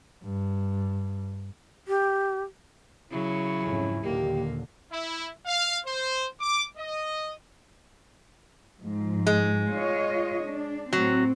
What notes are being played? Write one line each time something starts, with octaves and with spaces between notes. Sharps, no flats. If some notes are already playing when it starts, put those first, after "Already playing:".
G2
G4
C#3 F#3 E4
F2 G#2 C#4
D#2 A#2 D3 A#3 G4
E4
F5
C5
D6
D#5
G#2 F3
G#3
F4 C#5 D#5
D4
A2 F#3 C4